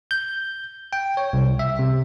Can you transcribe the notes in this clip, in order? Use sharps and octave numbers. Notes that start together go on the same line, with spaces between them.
G6
G5
C#5
C2
E5
C3